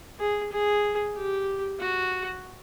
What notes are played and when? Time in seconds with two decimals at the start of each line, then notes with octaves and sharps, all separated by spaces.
0.19 G#4
0.52 G#4
1.15 G4
1.79 F#4